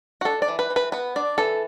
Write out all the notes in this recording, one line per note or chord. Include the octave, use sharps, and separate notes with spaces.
F#4
D4 A4
D5
E3
B4
E3
B4
B3 B4
D4 D5
E3 A4